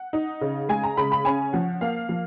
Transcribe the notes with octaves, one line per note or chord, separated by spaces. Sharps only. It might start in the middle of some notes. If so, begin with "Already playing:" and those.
Already playing: F#5
D#4
C#3
G#3 G#5
A#5
C#3 B5
B5
C#4 G#5
F3 F#5
A#3 F5
F3